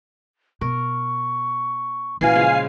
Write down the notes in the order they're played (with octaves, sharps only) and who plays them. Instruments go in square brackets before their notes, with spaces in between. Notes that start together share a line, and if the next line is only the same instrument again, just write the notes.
[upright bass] B2 [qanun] A#4 [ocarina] C#6
[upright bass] A#2 A#3 [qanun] E3 C#4 F#4 [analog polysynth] F5 G#5 C7
[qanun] C#3 F3 G#3